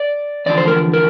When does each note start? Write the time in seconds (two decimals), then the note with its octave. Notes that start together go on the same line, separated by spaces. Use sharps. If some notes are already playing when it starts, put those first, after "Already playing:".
Already playing: D5
0.46 E2 D3 F3 D5
0.57 C5
0.67 A#4
0.93 A#4